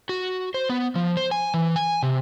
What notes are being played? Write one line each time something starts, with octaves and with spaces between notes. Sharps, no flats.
F#4
C5
B3
F3
C5
G#5
E3
G#5
C3